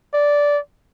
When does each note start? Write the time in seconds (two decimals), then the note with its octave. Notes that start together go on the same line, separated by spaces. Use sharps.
0.14 D5